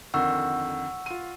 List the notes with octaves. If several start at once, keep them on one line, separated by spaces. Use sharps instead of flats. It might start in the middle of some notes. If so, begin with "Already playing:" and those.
F2 D3 D#3 F#5 C#6 E6
F4 D#7